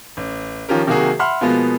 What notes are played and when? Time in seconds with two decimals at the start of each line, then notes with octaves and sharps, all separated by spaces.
0.17 A1
0.69 D#3 F3 C#4 G4 A#4
0.87 C3 D#3 F#3 A#3 F#4 G#4
1.19 E5 F#5 B5 C6 F6
1.41 B2 F3 G#3 A#3 B3